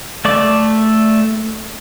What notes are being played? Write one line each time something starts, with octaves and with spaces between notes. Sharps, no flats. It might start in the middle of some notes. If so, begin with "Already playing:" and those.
A3 D5 D6